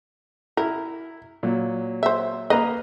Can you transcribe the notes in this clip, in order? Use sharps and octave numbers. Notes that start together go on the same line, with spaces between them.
E4 A#4
A#2 F#3
C5 E5
A#3 B4 D#5 A#5